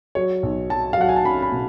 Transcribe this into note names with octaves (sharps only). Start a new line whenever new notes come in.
F#3 C#5
B1
F#3 A5
F5
F#3 F#5
G#5
A5
C#4 B5
B5
B2